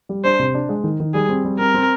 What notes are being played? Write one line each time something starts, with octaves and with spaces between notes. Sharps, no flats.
G3
D4 C5
C3
D4
G#3
D#3
D#3
G3 G#4
C4
G3
C4 A#4
C4